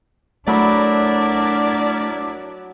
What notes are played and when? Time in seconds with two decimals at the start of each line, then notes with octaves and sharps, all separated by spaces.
0.47 F#3 A3 D4 E4 A#4 D5 B5